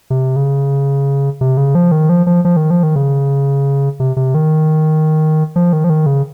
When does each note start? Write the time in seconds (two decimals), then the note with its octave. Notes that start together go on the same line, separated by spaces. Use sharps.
0.10 C3
0.36 C#3
1.41 C3
1.57 C#3
1.75 F3
1.92 D#3
2.09 F3
2.27 F3
2.45 F3
2.57 D#3
2.71 F3
2.83 D#3
2.96 C#3
4.00 C3
4.16 C3
4.35 D#3
5.56 F3
5.73 D#3
5.84 F3
5.90 D#3
6.06 C#3